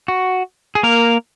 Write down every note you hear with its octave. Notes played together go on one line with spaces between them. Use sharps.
F#4
G#4
A#3 A#4